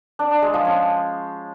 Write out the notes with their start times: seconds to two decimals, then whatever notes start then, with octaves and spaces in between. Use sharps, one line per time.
0.19 D4
0.31 D4
0.42 G#3
0.54 F3
0.65 C#4